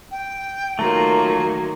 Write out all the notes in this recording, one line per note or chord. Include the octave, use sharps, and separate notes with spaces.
G5
D#3 F#3 A3 A#3 F4 A#5